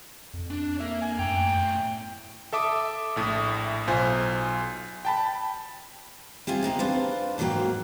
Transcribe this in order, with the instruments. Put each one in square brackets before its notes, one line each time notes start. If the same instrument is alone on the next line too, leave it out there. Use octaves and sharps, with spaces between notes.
[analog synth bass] F2
[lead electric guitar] D4
[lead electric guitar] A#3 A#4 [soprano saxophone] E5
[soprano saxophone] G#5
[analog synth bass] F#2 [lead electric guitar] A2 A#5 [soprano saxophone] G5
[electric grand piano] A4 E5 D6 D#6
A#1 A2 D#6
B1 F4 C5 G#5
G5 A5 B5
[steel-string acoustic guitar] G3 C4 E4 F4 G#5
G#3 A#3 C4 D#4
D4 F4 B4 C5
G#2 D#3 F3 F#3 A#3 G5